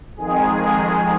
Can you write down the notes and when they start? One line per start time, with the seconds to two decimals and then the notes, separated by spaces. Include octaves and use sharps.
0.17 F2 D#3 G#3 G#4